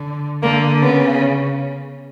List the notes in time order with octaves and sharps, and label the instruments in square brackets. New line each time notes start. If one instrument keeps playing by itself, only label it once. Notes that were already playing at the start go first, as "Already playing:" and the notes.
Already playing: [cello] D3
[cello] D3 [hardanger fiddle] A#3
[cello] C#3 [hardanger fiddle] B3